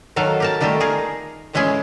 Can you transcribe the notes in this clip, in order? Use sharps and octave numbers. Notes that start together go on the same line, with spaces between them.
D#3 F#3 A4 F5
G4 A#4 A5
D#3 G3 A3 F4 G4
D#3 G#4 A#4 F5
A2 E3 G#3 C#4 E4 G#4